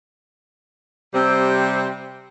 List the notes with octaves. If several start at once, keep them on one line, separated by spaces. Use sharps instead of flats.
C3 G3 C4